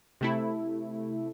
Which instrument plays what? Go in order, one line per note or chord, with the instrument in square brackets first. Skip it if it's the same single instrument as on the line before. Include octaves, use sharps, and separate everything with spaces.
[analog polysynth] C3 A3 E4